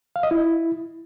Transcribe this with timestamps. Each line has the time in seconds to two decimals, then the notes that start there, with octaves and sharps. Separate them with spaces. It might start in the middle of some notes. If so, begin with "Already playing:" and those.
0.16 F5
0.23 D#5
0.31 E4